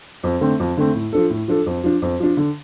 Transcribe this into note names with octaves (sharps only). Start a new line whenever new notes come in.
F2
D3 A3 C4
F2
D3 A3 C4
A2
F3 D4 A4
A2
F3 D4 A4
F2
F3 D4
F2
F3 D4
D3